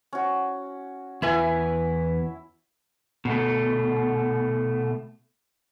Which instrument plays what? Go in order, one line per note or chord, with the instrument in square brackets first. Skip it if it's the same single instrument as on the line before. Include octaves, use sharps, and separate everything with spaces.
[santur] C#4 F#4
[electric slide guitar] E2 B4 G#5 [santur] E4
[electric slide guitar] B2 A3